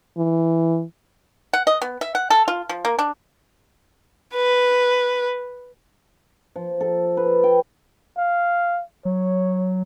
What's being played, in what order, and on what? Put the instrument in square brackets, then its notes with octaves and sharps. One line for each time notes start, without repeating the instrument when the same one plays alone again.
[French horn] E3
[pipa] F#5
D#5
B3
E5
F#5
A4
F4
F3
A#3
D4
[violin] B4
[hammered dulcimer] F3
A4
B4
G5
[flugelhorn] F5
[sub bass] F#3 [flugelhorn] C#5